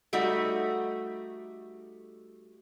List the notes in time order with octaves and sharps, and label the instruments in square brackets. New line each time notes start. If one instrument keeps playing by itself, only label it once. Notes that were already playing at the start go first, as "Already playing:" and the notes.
[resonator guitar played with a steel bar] G3 A3 D#4 F#4